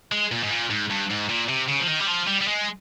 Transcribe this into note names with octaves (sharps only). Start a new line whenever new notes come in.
G#3
A#2
G#2
A#2
G#2
G2
G#2
A#2
C3
C#3
F3
D#3
G3
F3
G3
G3
G#3